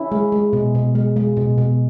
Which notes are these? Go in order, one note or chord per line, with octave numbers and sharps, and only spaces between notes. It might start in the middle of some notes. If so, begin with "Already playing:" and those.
Already playing: C#4 E4
G#3
G#3
B2
B2
G#3
G#3
B2
B2